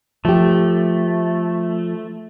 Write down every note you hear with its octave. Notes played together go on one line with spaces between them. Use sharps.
F3 A3 G4